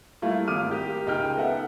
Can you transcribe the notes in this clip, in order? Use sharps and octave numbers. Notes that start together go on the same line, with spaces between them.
G3 A3 A#3 E4 F4
G#1 A#3 D6 D#6 F6 D#7
G4 A#4
C#2 D#4 G5 F6
B3 D#4 A4 E5 F#5